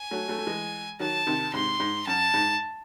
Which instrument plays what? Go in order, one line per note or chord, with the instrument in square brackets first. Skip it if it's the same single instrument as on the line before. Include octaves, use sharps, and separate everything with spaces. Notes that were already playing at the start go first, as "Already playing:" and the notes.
Already playing: [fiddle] G#5
[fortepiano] F#3 A3
F#3 A3
A3
E3 G#3
[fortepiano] D#3 F#3 [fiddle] A5
[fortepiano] C3 D#3
[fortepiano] G#2 C3 [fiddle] C6
[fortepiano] G#2
[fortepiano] F#2 [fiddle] A5
[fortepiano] G#2